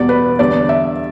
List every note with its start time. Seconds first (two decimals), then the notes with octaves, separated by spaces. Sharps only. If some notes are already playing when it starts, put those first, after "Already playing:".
Already playing: E2 B2 G3 D5
0.09 B4
0.39 E2 D3 G3 D5
0.69 E5